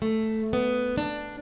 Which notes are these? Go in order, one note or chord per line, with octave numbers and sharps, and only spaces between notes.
A3
B3
D4